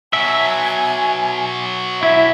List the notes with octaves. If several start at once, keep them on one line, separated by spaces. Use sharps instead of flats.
B2 F#3 E5 G#5
E4 E5